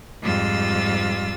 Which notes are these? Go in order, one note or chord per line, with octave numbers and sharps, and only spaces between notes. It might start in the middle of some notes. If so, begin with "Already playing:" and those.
F2 G#2 G3 F4 E6 A6